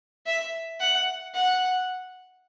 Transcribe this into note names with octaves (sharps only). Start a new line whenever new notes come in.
E5
F#5
F#5